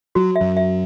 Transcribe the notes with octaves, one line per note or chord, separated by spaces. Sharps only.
F#3 F#4
E5
F#2 F#3
E5